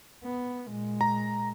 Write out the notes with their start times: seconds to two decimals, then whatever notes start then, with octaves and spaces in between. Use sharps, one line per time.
0.24 B3
0.68 A#2 G#3
1.01 A#5